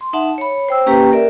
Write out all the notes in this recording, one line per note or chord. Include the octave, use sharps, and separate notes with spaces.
C6
D#4 E5 F#5 A5
C#5 B5
C5 G5 E6
A#3 C#4 G4 B4 G5 A#5
A#4 D5 E5